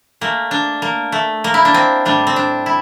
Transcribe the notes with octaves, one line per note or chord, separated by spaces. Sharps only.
A#2 A3 A#3
D4
A#3
A3
A#3
E4
D4
C4
A2 G3 D4
C4
D4
E4